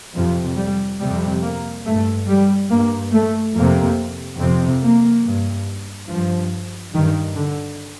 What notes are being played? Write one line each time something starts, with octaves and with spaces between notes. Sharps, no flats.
F2 C3 F3
G3
F2 C3 G3
A#3
G2 A3
G3
G2 A#3
A3
F2 C3 A#3
F2 C3 C4
A#3
G2
G2 F3
G2 D#3
D3